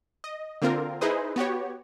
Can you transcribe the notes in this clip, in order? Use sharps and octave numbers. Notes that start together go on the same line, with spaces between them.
D#5
D3 A#3 C4 F4 A#4
D#4 E4 G#4 B4 C5 D#5
B3 F#4 G4 C#5